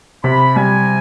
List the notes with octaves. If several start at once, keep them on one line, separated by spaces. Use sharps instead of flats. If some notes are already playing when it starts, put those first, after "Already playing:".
C3 B5
G3 G#5